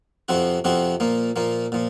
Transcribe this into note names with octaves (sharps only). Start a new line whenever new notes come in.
F2 C3 F3 C4 F#4
F2 C3 F3 C4 F#4
A#2 F3 A#3
A#2 F3 A#3
A#2 F3